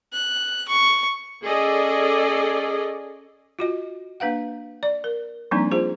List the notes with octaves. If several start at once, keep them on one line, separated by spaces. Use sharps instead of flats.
F#6
C#6
C#4 G#4 A4 D5 D#5
F4 F#4 D#5
A#3 D4 B4 F5 F#5
D5
A#4
F3 G3 A#3 C4 D4 D#4
F4 G#4 C5